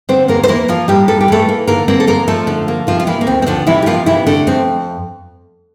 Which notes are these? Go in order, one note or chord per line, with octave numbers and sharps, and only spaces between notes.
D3 C4 C5
E2 A#3 A#4
C5
E3 A#3 A#4
F3 A#3 F4
A2 G3 G4
G3 A4
G4
E3 A3 A4
A#3
D3 A#3 A#4
A#3 C4 C5
A4
F2 A#3 A#4
F3 A3 A4
D3
A#3
C3 F3 F4
F4
E3 A#3 E4
A#3
D2 C4
C4
D3 F3 D4
C3 E3 E4
G4
F3 A#3 F4
C3 E3 E4
D3 A3 D4
F2 C4